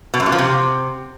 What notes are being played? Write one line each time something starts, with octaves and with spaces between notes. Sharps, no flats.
B2
F#2
A#2
F3
C3